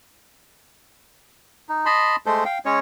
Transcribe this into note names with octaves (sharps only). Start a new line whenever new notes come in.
D#4
D#5 A5 B5 C6
G#3 A3 A4 C5
F5 G5
G#3 C#4 C#5